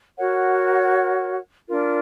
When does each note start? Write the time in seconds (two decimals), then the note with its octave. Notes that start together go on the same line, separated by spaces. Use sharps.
0.16 F#4 A#4 C#5 F#5
1.69 D4 F4 A#4